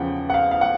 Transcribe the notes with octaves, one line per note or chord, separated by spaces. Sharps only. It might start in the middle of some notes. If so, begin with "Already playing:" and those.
Already playing: E2 C#3 F3 F#5 G5
F#5
F5
F5
F#5